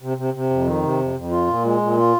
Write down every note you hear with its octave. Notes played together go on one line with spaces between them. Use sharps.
C3
C3
C3
F2
D#3
C3
F2
F2
F4
A#2
G#3
A#2
F4